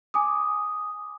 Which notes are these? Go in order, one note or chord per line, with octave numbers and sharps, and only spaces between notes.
G#5 D6 D#6